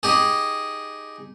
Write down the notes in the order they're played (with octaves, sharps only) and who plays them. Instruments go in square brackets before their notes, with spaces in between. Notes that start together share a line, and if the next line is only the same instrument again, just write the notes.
[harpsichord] D#4 G4 G#4